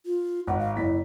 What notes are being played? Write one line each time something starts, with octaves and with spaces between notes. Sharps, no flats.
F4
G#1 F#5
F5
F#1 E4 B6